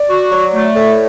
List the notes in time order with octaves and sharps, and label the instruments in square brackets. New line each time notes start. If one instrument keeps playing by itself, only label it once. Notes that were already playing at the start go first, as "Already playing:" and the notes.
Already playing: [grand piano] D5
[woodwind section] F#4
F#3
A3
A2